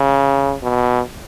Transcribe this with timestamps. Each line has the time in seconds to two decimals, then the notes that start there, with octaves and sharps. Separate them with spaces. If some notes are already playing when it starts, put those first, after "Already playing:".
Already playing: C#3
0.63 B2